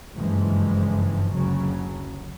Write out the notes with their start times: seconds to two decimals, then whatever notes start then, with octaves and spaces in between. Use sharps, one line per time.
0.16 F#1 G2 E3 F3 G#3
1.32 F#1 D2 C#3 F#3